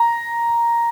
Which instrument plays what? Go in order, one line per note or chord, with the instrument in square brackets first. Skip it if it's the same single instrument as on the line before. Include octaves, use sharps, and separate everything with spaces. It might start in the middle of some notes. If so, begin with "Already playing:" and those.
Already playing: [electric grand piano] A#5